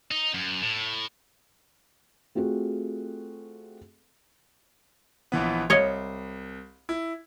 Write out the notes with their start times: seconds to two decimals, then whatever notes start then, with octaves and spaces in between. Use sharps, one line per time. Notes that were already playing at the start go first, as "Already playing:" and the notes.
0.11 D#4
0.34 F#2
0.62 A2
2.35 A3 C4 F4 F#4 G#4 A4
5.32 A#1 E3 B3
5.70 C2 C#5 D#5 F5
6.89 E4